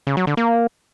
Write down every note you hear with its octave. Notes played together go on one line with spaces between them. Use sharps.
C#3
F#3
D3
A#3